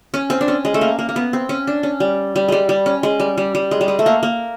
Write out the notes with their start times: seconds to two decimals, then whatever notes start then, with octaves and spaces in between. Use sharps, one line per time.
0.14 C#4
0.30 C4
0.41 D4
0.48 C#4
0.65 G#3
0.74 A3
0.81 A#3
0.99 A#3
1.09 A#3
1.16 B3
1.33 C4
1.49 C#4
1.67 D4
1.83 C#4
2.00 G3
2.36 G3
2.48 G3 G#3
2.69 G3
2.86 C#4
3.03 G#3
3.20 G3
3.38 G3
3.55 G3
3.71 G#3
3.81 G3
3.88 G#3
3.99 A3
4.06 A#3
4.23 A#3